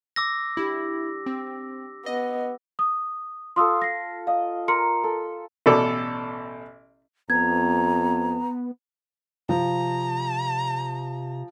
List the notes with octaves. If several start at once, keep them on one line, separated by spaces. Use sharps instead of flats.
D6 E6 A#6
D4 E4 G4
C4
B3 D#5
D#6
F4 A4 C6 D#6 E6
A#6 C7
D#5 F5
A#4 C6 C#7
A4
A1 B2 A4 D5 D6
F2 B3 A#5 G#6
C3 F3 A#5